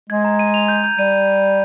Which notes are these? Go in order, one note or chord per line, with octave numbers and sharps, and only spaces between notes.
G#3 G#6
A#5
D#7
F7
G6
G6
G3 D#7